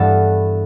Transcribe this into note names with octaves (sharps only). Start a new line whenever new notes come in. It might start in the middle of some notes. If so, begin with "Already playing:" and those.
Already playing: G2 E3 B3 A4